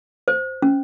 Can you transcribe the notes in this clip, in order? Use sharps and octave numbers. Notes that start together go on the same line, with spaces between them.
C5
C#4